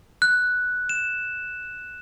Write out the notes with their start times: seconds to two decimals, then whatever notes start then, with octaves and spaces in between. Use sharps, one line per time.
0.22 F#6
0.89 E7